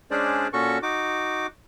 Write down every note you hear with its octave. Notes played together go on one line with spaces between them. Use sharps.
G#3 C#4 D4 G#4 C5 D5
A#2 C#4 F#4 A4 C#6
D#4 F#4 D6